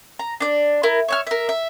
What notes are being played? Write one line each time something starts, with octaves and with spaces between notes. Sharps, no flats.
A#5
D4 D5
E4 A#4
C#5 E5 F6
A#4 E5
E5